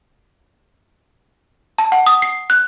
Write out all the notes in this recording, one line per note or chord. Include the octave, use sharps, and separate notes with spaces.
A5
F#5
D#6
C7
F#6